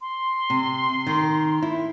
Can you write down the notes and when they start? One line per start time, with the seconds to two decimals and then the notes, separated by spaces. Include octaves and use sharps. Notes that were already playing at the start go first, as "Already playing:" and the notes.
0.01 C6
0.50 C3
1.07 D#3
1.62 E4